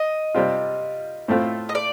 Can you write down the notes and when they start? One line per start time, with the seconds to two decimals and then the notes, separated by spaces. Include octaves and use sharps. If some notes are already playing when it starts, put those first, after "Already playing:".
Already playing: D#5
0.35 C3 G3 C4 F4
1.28 A2 A3 C4 F4
1.69 D#5
1.75 D5